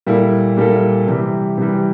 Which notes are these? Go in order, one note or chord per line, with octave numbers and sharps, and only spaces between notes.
A#2 G3 A#3 E4 A4
A#2 G3 A#3 E4 A4
C3 E3 G3
C3 E3 G3